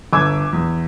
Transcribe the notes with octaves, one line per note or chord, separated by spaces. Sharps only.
G1 G#5 D6 E6 G#6
E2